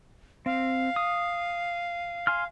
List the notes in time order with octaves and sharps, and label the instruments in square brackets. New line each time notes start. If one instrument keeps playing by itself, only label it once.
[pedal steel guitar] C4 [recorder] F5
[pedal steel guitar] D#6
G#5 C6 F6